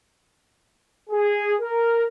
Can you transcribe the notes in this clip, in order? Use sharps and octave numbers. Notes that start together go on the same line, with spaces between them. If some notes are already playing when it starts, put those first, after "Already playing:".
G#4
A#4